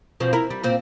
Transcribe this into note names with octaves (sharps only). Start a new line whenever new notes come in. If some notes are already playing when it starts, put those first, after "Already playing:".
B2 F3 C4
E4 A#4
G3
A#2 C4